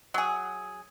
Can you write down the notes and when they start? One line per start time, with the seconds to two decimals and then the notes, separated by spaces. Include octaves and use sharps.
0.14 F#3 G#4